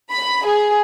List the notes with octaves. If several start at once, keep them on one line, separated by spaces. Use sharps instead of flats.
B5
G#4